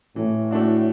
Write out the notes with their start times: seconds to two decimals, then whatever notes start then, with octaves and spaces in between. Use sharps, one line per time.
0.16 A2 E3
0.51 A3 D4 F#4